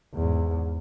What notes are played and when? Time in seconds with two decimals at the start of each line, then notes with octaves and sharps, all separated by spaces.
0.14 E2 G#2